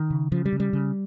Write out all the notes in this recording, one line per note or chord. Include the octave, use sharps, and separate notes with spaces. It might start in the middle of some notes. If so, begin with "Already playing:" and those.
Already playing: D#3
C#3
C#3 F3
G3
C#3
G3
C#3